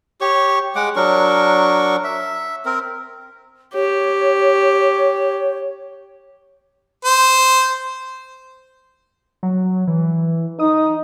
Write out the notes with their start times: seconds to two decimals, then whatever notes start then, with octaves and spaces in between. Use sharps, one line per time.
0.21 G4 C#5 C#6
0.76 G#3 F#5 D6
0.96 F#3 D4 A#4 C#6
2.04 E5
2.66 C4 A#4
3.74 G4 C#5
7.05 C5
9.43 F#3
9.87 E3
10.59 D#4 D#6